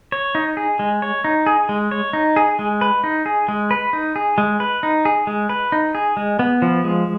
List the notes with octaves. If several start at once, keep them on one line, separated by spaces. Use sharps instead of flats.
C#5
D#4
G#4
G#3
C#5
D#4
G#4
G#3
C#5
D#4
G#4
G#3
B4
D#4
G#4
G#3
B4
D#4
G#4
G#3
B4
D#4
G#4
G#3
B4
D#4
G#4
G#3
B3
F3
G#3